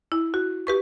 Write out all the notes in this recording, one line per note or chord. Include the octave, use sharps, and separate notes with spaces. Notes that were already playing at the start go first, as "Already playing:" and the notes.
E4
F#4
G4 B4 C#6